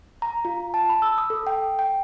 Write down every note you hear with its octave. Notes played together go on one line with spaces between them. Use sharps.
A#5
F4
A5
B5
E6
D#6
A4
G5
G5